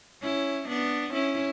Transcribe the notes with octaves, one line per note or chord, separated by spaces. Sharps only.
C#4 E4
B3 D4
C#4 E4